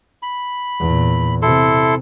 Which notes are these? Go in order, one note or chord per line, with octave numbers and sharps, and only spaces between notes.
B5
E2 A#2
C3 E4 A4 C6